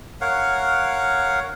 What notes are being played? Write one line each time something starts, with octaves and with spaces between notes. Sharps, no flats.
A#4 C#5 F5 F#5